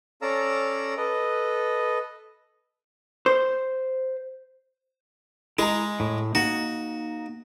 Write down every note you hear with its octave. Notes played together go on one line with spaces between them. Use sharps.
C#4 A4 D5 F5 A#5 E6
A4 B4 D#5
C5
G#3 E4 A#5
A2
A#3 D#4 F#4